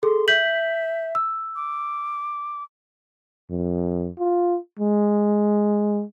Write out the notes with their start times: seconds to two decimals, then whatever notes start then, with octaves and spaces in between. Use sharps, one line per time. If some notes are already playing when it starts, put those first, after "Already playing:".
0.03 G#4 A4 C6
0.28 E5 G6 B6 F#7
1.15 E6
1.55 D6
3.50 F2
4.19 F4
4.79 G#3